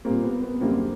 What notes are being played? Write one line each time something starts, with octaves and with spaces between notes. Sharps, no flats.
A#2 G3 A#3 C4
B3
B3
F#2 D3 G3 A#3 C4